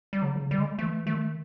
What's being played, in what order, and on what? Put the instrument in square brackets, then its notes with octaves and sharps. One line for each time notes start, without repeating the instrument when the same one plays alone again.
[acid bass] G3
[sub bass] C#3 [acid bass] F#3
[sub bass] C#3
[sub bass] D3 [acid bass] G3
[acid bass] G#3
[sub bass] E3 [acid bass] A3
[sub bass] D#3 [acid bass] A3